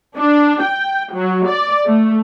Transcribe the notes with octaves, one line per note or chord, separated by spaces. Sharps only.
D4
G5
F#3
D5
A3